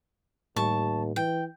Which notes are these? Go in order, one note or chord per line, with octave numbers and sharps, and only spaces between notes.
D#2 A2 G3 A5 C#6
E3 G5